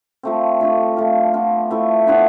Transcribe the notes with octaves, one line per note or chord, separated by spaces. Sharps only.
F3 A3 C4
F3 A3 D4 G4
F3 A3 C4 F4
F3 B3 F4
F3 A3 E4 A4
A2 F3 B3 D4